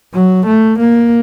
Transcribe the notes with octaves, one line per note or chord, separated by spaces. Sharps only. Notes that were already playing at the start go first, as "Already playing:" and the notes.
F#3
A3
A#3